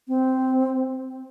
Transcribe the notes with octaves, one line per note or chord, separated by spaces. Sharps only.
C4